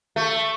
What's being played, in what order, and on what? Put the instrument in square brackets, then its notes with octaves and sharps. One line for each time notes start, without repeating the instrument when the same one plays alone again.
[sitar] A3